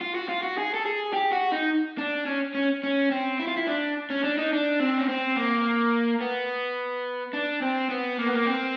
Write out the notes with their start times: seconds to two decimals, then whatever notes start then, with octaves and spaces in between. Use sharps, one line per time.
0.01 F4
0.15 F#4
0.29 F4
0.43 F#4
0.58 G#4
0.74 A4
0.86 G#4
1.13 G4
1.32 F#4
1.52 D#4
1.98 D4
2.26 C#4
2.55 C#4
2.84 C#4
3.11 C4
3.39 E4
3.47 F4
3.57 E4
3.67 D4
4.10 C#4
4.23 D4
4.38 D#4
4.53 D4
4.80 C4
4.98 C#4
5.09 C4
5.36 A#3
6.21 B3
7.34 D4
7.62 C4
7.90 B3
8.19 A#3
8.27 B3
8.34 A#3
8.46 C4